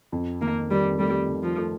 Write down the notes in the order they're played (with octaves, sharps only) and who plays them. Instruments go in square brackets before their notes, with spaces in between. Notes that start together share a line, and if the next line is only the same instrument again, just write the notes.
[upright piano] F2
[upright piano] D#3 [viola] A#3
[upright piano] D#3 [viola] G3
[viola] G3 [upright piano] A3
[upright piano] D#3
[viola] F3
[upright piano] A3